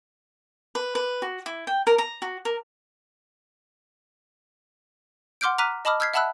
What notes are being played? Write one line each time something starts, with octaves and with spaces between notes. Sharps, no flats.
B4
B4
F#4
E4
G5
A#4
A#5
F#4
A#4
F#5 C6 D6 F6 G6 D7
A#5 D6 F6 F#6 B6 D#7
D#5 A5 B5 D6 D#6 F6
E6 F6 G6 G#6 B6 C7
E5 F#5 A5 B5 E6 F#6